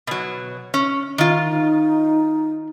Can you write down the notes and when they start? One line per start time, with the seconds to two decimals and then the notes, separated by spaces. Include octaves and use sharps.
0.07 B2 F#3
0.74 C#4
1.18 D#3 F4
1.49 D#4